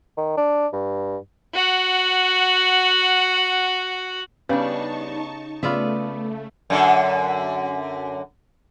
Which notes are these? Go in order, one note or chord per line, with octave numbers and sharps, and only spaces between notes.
D#3
D4
G2
F#4 F#5
C#3 G3 B3 D4 D#4 G4 A5 C#6
C#3 A3 B3 F4 B4 D5 E5
F#2 D3